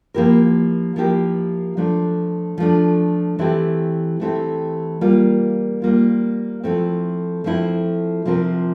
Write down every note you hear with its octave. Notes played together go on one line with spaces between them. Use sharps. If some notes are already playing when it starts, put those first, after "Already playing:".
F3 A#3 E4 G4 A#4
F3 A#3 E4 G4 A#4
F3 A3 D4
F3 A3 D4
E3 A3 C4 E4 G4
E3 A3 C4 E4 G4
G3 A#3 F4
G3 A#3 F4
F3 A3 C4 E4
F3 A3 C4 E4
C3 F3 C4 F4 A#4